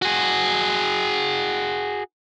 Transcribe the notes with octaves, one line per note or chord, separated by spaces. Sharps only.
F#4 G#4